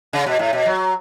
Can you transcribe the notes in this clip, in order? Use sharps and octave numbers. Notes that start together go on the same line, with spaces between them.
C#3
B2
A2
B2
F#3